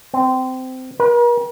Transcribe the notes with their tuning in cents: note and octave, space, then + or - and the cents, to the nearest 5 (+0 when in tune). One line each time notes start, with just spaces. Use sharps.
C4 -20
A#4 +45